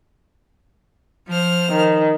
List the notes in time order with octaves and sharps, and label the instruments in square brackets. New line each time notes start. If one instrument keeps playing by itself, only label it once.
[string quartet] F3 C5 F6
[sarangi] D#3